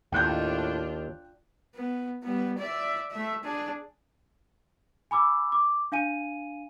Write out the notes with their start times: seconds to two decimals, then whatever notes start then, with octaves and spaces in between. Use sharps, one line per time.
0.12 D#2 A2 D4 F4 G5 F#6 G6
1.76 B3
2.23 G3 B3
2.59 D5 E5
3.11 A3 E5
3.44 D4 G#4
5.11 G#5 B5 D6 E6
5.52 D6
5.92 D4 F5 G#5 D#7